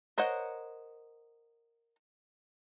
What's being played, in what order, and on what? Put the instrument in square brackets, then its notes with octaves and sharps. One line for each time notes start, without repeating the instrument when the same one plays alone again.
[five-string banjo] A#4 C5 C#5 D#5 F#5